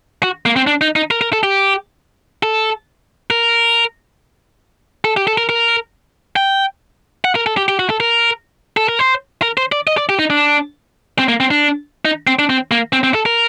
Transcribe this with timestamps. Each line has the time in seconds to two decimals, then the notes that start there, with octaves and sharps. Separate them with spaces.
0.23 F#4
0.46 A#3
0.56 C4
0.67 D4
0.81 D#4
0.96 D#4
1.11 A#4
1.21 A#4
1.33 A4
1.43 G4
2.43 A4
3.31 A#4
5.05 A4
5.17 G4
5.27 A4
5.38 A#4
5.49 A#4
6.36 G5
7.25 F#5
7.35 A#4
7.47 A4
7.57 G4
7.68 G4
7.79 F#4
7.90 A4
8.00 A#4
8.77 A4
8.89 A#4
8.99 C5
9.42 A#4
9.57 C5
9.72 D5
9.87 D#5
9.98 D5
10.09 G4
10.19 D#4
10.30 D4
11.19 C4
11.28 A#3
11.40 C4
11.51 D4
12.05 D#4
12.27 C4
12.39 D4
12.50 C4
12.71 A#3
12.93 C4
13.04 C4
13.14 A4
13.26 A#4